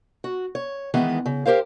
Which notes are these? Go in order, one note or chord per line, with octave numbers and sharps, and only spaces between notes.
F#4
C#5
D#3 E3 G#3 B3
C#3
G4 A#4 C5 F5